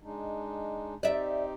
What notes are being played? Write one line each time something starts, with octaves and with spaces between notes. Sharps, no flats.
G#3 D4 D#4
C4 D#4 G4 D5 E5